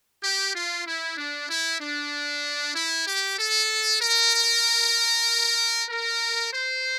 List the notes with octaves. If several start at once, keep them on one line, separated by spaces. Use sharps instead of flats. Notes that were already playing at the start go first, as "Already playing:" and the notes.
G4
F4
E4
D4
E4
D4
E4
G4
A4
A#4
A#4
C5